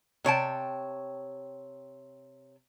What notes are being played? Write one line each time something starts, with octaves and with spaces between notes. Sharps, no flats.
C3 C#5 G5 A5